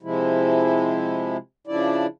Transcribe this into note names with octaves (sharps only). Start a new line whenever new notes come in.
C3 F3 G#3 E4
C#3 F3 D4 E4 D5